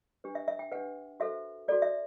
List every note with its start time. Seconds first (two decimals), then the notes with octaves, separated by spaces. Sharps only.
0.24 D4 G4 B4
0.35 E5
0.48 E5
0.59 G5
0.72 D4 G4 B4 F#5
1.20 F#4 A4 C5 E5
1.68 F#4 A4 C5 D5
1.82 E5